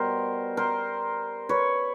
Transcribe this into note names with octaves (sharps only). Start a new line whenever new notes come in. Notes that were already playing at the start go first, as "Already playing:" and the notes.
Already playing: B2 G3 A#4 C5
A#4 C5
B4 C#5